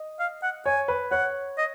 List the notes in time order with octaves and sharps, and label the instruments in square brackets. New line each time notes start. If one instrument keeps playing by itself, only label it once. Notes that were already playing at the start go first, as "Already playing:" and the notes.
Already playing: [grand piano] D#5
[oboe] F5
F#5
[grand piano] C#5 [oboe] G#5
[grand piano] B4
[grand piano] C#5 [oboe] F#5
[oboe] D#5